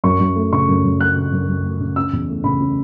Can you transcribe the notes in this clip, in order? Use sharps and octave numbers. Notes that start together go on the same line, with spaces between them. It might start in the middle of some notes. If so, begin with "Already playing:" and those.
F#2 C#6
F#2
A3
C#3 C#6
F#2
F#2
A3 F#6
C#3
F#2
F#2
A3
C#3
C#4 E6
E2
A3
C#3 B5
C#4